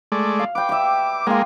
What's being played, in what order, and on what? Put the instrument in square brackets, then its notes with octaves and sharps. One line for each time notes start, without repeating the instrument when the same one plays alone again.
[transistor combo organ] G#3 A3 D5
[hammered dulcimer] F5
[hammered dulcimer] B4 G5 [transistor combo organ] D6
[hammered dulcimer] G4 E5
[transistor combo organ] G#3 A#3 [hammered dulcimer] F4 G5